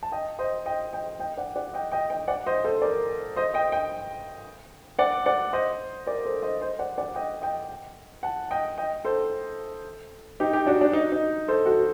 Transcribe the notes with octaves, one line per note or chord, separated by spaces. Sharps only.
A5
D#5 G5
C5 D#5
D#5 G5
D#5 G5
D#5 G5
D5 F#5
D5 F#5
D#5 G5
D#5 G5
D#5 G5
D5 F#5
C5 D#5
A4 C5
A#4 D5
C5 D#5
D#5 G5
D#5 G5
D5 F#5
D5 F#5
C5 D#5
A#4 D5
A4 C5
C5 D#5
C5 D#5
D5 F#5
D5 F#5
D#5 G5
D#5 G5
F#5 A5
D#5 G5
D#5 G5
A4 C5
D#4 G4
D#4 G4
D4 F#4
D4
D#4
D#4
A4 C5
F#4 A4